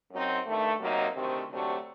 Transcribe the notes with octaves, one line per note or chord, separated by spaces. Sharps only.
F#2 F#3 C4 D#4
G2 D#3 A3
C3 F#3 A#3 D#4
D2 C3 D#3 A3 C4
D2 C3 F#3 A3 D4